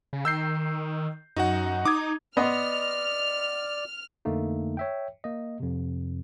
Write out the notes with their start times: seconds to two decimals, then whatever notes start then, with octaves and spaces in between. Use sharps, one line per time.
0.13 C#3
0.25 D#3 E6 G6 C7
1.36 F#2 D#4 F#4 F#5
1.85 D#4 D6 D#6 G#6
2.37 B3 D5 D#5 F#5 C6 F6
4.25 F2 D3 A3 A#3 D#4
4.77 C#5 E5 G5
5.24 A#3 D#5
5.60 F2 C3